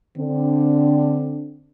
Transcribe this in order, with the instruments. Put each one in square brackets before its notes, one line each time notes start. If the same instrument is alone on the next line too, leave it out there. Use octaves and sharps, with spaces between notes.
[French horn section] D3 C4 D4